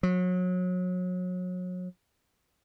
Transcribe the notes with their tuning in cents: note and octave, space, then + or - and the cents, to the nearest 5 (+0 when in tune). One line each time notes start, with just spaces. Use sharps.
F#3 -30